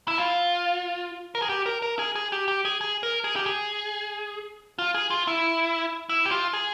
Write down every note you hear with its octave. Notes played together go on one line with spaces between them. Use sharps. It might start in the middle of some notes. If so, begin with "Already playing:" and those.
E4
F4
A#4
G#4
G4
A#4
A#4
G#4
G#4
G4
G4
G#4
G#4
A#4
G#4
G4
G#4
F4
G#4
F4
E4
E4
G4
F4
G#4